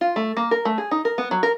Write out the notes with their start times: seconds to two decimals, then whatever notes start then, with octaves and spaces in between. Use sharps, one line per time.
0.01 F4
0.16 A3
0.37 A#3
0.51 A#4
0.65 A3
0.78 G#4
0.91 D#4
1.05 A#4
1.18 B3
1.31 F#3
1.43 A#4